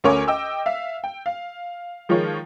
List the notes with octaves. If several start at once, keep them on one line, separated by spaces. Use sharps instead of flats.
D2 C#4 A#4 C#5 G#5 D6
D#5 G5 D6 E6
E5 F5
G5
F5
D#3 F3 G#3 F4 C#5